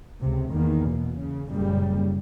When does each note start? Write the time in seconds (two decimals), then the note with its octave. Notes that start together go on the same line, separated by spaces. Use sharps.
0.20 C#2 C3
0.52 E2 D#3 A#3
0.89 B2
1.19 C#3
1.48 F#1 A#2 C#3 G3